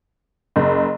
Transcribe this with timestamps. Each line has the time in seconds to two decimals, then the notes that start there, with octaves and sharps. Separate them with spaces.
0.56 F#1